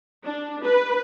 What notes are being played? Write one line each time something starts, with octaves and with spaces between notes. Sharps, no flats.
D4
B4